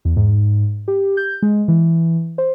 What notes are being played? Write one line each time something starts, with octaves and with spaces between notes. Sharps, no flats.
E2
G#2
G4
G6
G#3
E3
C5